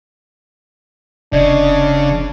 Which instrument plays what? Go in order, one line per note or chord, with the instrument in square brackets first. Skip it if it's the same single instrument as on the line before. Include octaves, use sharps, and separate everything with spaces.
[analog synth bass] F1 [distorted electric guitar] C#3 [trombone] D4 [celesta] D5 D#5